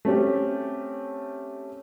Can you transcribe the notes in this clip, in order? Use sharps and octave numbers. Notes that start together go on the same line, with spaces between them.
A3 C4 C#4 G4